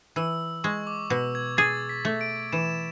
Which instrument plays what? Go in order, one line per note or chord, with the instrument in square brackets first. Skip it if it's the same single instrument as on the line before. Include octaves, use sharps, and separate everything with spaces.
[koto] E3 [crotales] E6
[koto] G#3 [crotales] C#6
[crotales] D6
[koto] B2 [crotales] E6
[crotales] G#6
[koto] G#4 [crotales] A6
[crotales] B6
[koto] A3
[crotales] D7
[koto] E3 [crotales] E7